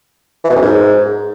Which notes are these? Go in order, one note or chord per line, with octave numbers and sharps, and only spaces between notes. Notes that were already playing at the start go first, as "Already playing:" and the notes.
E3
B2
F#2
G#2